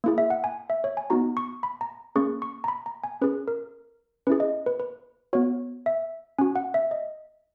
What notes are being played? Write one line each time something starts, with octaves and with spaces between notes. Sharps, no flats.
A#3 E4 G#4
E5
F#5
G#5
E5
C#5
G#5
B3 D#4 F#4 A#5
C#6
B5
A#5
A#3 C#4 G#4 C#6
C#6
A#5
B5
A#5
G#5
C#4 G#4 B4
A#4
C#4 E4 G#4 B4
D#5
B4
B4
B3 F#4 C#5
E5
C#4 F#4 G#5
F#5
E5
D#5